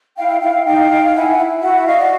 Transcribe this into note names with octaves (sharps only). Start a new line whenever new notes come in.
E4 F5 G5
E4 F5 G5
D#4 F5 G5
D#4
E4 F#5 G#5
E4
F#4 E5 F#5
F#4 D#5 F5
D5